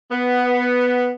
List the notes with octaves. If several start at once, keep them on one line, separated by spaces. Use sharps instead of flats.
B3